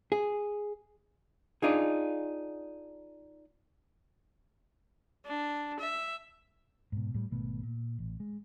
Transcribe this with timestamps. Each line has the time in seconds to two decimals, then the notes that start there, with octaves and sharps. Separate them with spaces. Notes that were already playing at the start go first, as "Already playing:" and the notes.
0.12 G#4
1.62 D4 D#4 F4 G#4
5.26 D4
5.80 E5
6.92 G#2 B2
7.14 A2 G3
7.31 G#1 B2 A3 B3
7.63 A#2
7.99 A1
8.20 G#3